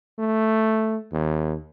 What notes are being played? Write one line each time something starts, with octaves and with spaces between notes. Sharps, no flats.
A3
D#2